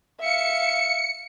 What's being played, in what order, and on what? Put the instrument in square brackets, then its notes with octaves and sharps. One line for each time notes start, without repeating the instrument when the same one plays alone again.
[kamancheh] E5 F5 [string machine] C#7